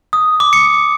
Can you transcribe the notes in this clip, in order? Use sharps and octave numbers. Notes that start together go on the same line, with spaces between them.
D#6
D6
C#7